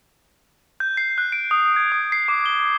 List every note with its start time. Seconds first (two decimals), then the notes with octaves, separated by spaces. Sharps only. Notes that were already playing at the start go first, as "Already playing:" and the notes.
0.80 G6
0.97 C7
1.18 F#6
1.32 D7
1.51 D#6
1.76 G#6
1.92 D#6
2.12 C7
2.28 D6
2.46 G7